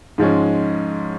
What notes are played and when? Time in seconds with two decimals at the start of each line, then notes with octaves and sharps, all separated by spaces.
0.18 G#2 F3 G#3 C#4